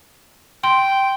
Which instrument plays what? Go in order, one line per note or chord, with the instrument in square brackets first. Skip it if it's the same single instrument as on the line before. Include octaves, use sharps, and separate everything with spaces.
[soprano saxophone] G5 [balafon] C6